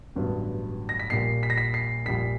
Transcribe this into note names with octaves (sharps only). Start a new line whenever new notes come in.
A1 G2 D3 F#3 B3
A#6
B6
A#1 A#2 G3 C7
B6
A#6
B6
C7
A#1 A#2 G3 B6